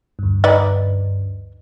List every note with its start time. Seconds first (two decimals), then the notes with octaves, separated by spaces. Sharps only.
0.19 D2 G2
0.44 D#4 B4 D5